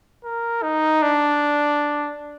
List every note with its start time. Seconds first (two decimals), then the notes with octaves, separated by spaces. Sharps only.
0.25 A#4
0.63 D#4
1.02 D4